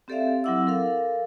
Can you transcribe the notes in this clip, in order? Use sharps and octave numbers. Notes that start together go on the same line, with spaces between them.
C4 G4 A4 D5 E5 F5
F#3 C4 E4 F#5 D6 E6
A4 A#4 F5